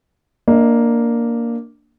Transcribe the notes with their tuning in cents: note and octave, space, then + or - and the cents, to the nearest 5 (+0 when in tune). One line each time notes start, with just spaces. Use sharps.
A#3 +0 D4 +0 D#5 +25